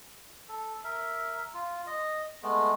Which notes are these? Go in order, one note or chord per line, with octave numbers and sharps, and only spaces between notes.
A4
A#4 E5
F4
D#5
G#3 A3 B3